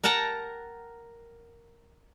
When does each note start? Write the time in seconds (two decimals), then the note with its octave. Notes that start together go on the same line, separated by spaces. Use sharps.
0.03 A#4 F#5 G5 A5 A#5